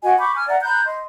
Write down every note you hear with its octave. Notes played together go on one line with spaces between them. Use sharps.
F#4 D#5 F#5 G#5
B5 C#6 D6 G6
G#5 F6
D5 E5 F#5 A#5
A#5 B5 F#6 G6
D#5 C6